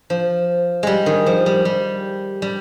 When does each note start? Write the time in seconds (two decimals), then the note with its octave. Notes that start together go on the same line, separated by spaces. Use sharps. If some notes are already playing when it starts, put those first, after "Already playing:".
0.10 F3
0.83 G3 G#3
1.06 D#3
1.26 F3
1.46 G3
1.65 G3
2.42 G3